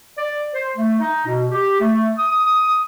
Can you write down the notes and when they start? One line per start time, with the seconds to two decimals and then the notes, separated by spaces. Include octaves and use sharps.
0.18 D5
0.54 C5
0.77 A3
1.00 D#4
1.27 B2
1.51 G4
1.80 A3
2.19 D#6